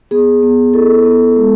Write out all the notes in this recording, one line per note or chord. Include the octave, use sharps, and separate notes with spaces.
B3 G#4
B3
E4 A4
B3
G#3